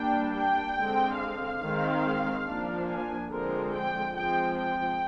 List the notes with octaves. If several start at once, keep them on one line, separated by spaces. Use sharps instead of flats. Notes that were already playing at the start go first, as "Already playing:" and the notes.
Already playing: G3 A#3 D4 G5
G5
D3 G#3 C4
F5
D#3 G#3 C4
F3 A#3 D4
G#5
D3 F3 G#3 C4 A#4
G5
F3 G#3 C4 G5
G5